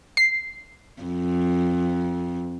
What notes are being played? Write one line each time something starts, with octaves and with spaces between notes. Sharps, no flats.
C7
F2